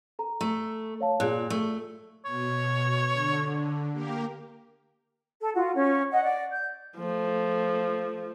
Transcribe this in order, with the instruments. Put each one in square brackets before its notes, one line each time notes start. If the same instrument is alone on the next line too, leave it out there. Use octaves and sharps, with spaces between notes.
[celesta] A4 A#5
[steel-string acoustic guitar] A3
[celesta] C#5 F5 A5
[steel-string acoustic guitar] A#2 [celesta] F4 G#4 F#6
[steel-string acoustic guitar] A3
[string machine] B2 [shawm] C#5
[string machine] D3
A#3 G4 A#4
[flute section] A4
F4 F#4
C#4
D#5 F#5
D5
G6
[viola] F3 A3